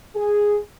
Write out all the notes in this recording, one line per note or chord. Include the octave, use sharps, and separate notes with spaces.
G#4